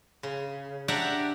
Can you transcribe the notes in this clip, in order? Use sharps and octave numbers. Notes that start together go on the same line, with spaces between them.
C#3
D4 G4 D5 E5 F#5 A#5